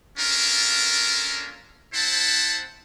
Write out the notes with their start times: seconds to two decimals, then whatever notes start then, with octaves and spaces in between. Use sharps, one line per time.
0.18 A#3 C#4 D4 F4 A4 A#4
1.94 C4 E4 C5 F#5 A5